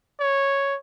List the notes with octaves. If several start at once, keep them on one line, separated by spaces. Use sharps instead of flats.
C#5